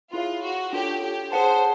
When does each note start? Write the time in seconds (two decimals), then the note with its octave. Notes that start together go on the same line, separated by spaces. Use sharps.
0.13 E4 F4 G#4 C#5 F5
0.43 F#4
0.73 D4 F4 G4 A4 C#5
1.02 G4
1.32 G#4 C5 C#5 F#5 A5